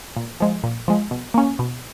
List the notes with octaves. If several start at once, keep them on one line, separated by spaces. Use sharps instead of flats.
A#2
F3 G#3
A#2
F3 G#3
B2
A#3 C#4
B2